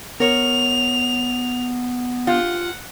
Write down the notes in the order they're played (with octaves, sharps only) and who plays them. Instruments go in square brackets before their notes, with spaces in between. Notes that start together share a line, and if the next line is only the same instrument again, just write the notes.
[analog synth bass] B3 [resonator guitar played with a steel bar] A#4 C#5 [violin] F7
[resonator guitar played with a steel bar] F4 G4 [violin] F#5